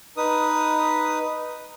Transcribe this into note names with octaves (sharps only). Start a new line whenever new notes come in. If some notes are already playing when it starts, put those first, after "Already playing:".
D#4 B4 D#6